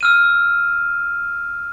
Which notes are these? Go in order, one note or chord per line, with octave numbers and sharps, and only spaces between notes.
E6 F6 D#7